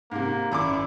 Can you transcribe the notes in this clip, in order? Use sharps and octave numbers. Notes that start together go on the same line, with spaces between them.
G#2 C3 A#3
G#1 F#2 E4 D6